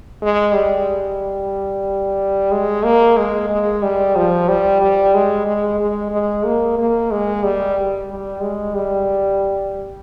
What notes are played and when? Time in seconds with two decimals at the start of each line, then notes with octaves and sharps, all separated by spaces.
0.22 G#3
0.54 G3
2.52 G#3
2.84 A#3
3.17 G#3
3.50 G#3
3.83 G3
4.16 F3
4.48 G3
4.81 G3
5.15 G#3
5.47 G#3
5.80 G#3
6.12 G#3
6.45 A#3
6.78 A#3
7.11 G#3
7.44 G3
8.10 G3
8.42 G#3
8.75 G3